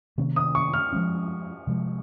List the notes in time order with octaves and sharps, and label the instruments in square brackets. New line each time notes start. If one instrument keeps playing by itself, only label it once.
[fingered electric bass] C3 D#3 A#3 C#4
[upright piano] D#6
C#6
F6
[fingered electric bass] F3 G#3 C#4
C3 F3 G#3